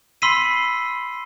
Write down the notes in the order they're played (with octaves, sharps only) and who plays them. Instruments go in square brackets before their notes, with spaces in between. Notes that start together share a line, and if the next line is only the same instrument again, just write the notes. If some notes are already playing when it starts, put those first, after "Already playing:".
[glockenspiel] B5 C6 E6 B6 C7 D#7